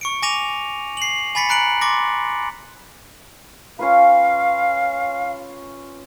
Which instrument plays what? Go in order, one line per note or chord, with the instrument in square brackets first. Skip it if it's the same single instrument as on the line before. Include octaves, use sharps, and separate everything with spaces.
[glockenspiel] C#6 C#7 D7
G#5 D6 A#6 D#7 F7
C7 F#7
G#5 B5 A6 B6 C#7
A#5 B5 F#6 C#7 D7 F#7
C6 D6 A6 A#6
[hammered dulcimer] C#4 F4 B4 [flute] F5